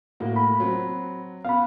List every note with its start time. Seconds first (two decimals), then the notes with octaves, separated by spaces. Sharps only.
0.20 A2 A#3 F#4
0.36 B5
0.60 F#3 C4
1.45 B3 F5 B5